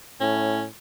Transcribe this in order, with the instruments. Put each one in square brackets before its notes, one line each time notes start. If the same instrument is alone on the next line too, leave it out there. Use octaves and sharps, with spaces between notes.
[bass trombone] A2 [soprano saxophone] C#4